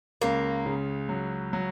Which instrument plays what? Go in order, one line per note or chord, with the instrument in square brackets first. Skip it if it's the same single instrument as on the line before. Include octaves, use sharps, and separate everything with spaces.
[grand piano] C#2 [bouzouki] A#3
[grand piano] C#3
F#3
F#3